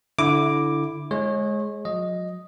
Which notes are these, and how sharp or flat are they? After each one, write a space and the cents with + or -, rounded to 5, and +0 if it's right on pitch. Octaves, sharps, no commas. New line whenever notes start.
D3 -15 E4 +0 D6 +0
G#3 +10 C#5 -25
F#3 -45 D#5 +0